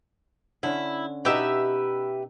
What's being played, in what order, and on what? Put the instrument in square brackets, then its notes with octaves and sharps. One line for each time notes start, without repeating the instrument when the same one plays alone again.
[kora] D3 C#4 [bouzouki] E4
[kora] B2 D#4 [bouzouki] G4 B4 E5